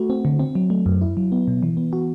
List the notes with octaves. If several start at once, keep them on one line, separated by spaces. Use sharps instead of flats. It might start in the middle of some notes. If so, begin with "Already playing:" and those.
Already playing: A3 F#4
C4
D3
C4
F#3
A3
F#2
E4
F#3
B3
B2
E3
B3
F#4